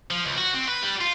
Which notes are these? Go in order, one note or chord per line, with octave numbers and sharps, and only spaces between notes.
F3
C#2
F#4
C4
B4
G3
F4